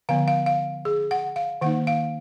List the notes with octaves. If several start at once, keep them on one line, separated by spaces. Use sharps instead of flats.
D3 F3 B3 F5
F5
F5
G#4
F#5
F5
D#3 A#3 D#4 F#5
F5